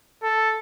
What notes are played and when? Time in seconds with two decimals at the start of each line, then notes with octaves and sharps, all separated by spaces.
0.23 A4